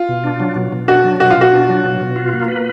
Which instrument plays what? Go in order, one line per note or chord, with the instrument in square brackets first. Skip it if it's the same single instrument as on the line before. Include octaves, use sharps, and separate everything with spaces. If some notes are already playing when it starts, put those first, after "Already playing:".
Already playing: [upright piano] F4
[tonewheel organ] B2
D4
F#3
B2
B2
[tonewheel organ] D4 [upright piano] F#4
[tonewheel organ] F#3
[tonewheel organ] B2 [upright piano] F#4
[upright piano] F4
[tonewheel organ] B2 [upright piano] F#4
[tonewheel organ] D4
F#3
B2
B2
F4
A#3
B4